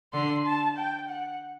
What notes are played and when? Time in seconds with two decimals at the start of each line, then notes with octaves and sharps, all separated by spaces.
0.13 D3 C6
0.45 A5
0.77 G5
1.09 F#5